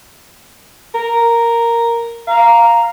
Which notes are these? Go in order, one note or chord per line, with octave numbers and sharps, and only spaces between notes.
A#4
F5 A#5